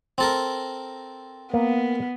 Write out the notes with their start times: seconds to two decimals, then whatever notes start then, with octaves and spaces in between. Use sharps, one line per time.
0.18 C4 A4 A#4
1.54 A#3 B3